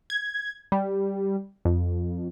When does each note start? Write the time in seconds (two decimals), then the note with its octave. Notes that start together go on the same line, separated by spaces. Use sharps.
0.10 G#6
0.72 G3
1.65 F2